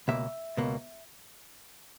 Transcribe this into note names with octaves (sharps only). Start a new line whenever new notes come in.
C#2 B2 A#3 E5
C#2 B2 A#3